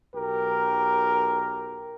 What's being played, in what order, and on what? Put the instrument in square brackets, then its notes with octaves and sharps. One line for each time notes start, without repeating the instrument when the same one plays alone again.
[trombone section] B1 G4 A#4